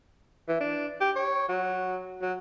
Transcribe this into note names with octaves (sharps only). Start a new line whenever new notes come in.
E3
D4
G4
C#5
F#3
F#3